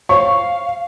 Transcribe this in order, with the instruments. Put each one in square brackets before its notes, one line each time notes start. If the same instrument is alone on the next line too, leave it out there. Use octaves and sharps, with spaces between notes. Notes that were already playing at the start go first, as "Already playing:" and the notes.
[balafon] C5 C#5 [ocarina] F5 [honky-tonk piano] C#6